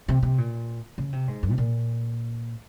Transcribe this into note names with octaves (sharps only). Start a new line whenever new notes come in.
C3
C3
A#2
C#3
C3
G#2
F#2
C3
A#2